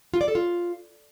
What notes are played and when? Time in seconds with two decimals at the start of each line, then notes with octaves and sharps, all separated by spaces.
0.14 F4
0.21 D5
0.28 A4
0.35 F4